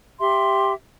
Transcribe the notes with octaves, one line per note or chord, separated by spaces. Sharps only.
G4 E5 C6